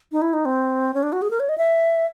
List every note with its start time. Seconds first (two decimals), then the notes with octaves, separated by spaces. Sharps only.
0.12 D#4
0.22 E4
0.33 D#4
0.45 C4
0.94 C#4
1.03 D4
1.12 F#4
1.22 G#4
1.31 A#4
1.40 C#5
1.49 D#5
1.58 E5